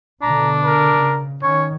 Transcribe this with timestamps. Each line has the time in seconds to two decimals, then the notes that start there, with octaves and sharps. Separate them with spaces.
0.22 B2 D3 D4 A#5
0.65 A#4
0.96 C#3
1.43 D#3 C#4 C#5